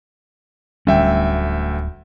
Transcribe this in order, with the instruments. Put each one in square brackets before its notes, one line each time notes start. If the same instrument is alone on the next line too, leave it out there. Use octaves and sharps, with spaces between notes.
[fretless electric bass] D1 G3 C#4 [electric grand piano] D2 E5 G5